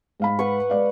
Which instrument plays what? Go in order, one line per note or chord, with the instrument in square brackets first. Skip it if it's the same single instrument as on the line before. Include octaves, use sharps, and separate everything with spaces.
[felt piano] G#2 F5 B5
[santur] B4 F#5 C#6
[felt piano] G#3 D5 F5